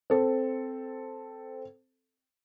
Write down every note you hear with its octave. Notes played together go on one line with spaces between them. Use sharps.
C4 A4